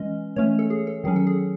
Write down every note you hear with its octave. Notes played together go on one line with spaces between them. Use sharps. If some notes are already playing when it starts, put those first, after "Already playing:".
Already playing: E3 G#3 C#4 D#5
E3 A3 C#4 C#5
A4
G#4
A4
D#3 F#3 C#4 G#4
A4
G#4